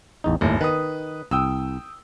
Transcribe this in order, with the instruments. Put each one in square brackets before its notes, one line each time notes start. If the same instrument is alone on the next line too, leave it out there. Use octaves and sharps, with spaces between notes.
[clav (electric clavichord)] A1 E2 D#4
[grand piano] G1 [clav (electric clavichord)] D#2 A2 A3
[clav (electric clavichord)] D#3 [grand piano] B4 D#6
[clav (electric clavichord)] C2 [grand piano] G5 D#6 E6